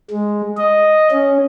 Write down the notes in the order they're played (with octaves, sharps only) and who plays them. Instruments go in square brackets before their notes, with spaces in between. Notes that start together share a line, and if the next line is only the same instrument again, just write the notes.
[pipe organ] G#3
D#5
C#4